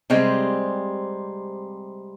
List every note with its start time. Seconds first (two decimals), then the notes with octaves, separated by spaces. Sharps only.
0.10 C3 G3 G#3 C4